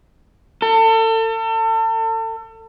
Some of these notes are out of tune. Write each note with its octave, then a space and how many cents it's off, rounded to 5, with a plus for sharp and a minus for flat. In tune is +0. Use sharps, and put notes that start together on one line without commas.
A4 +35